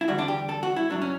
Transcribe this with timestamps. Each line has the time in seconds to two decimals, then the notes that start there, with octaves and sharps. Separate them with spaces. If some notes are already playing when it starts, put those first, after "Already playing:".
0.01 E4
0.08 E2 D3 G3 F#4
0.19 D4
0.28 G4
0.49 A4
0.63 F#4
0.76 E4
0.90 G2 F#3 A3 D4
1.02 C#4